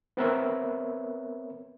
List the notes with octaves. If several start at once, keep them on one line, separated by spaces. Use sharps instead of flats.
B3 C4 A#4 B4 C#5 E5